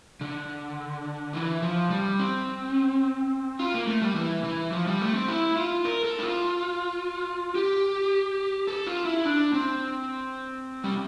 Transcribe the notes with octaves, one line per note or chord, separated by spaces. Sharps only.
D3
E3
F3
G3
C4
F4
A#3
A3
G3
E3
E3
F3
G3
A3
C4
E4
F4
A#4
A4
E4
F4
G4
A4
F4
E4
D4
C4
G3